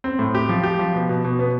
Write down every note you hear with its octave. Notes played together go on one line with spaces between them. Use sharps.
C4
A2
G4
F3
G4
F3
B2
B2
B2
B3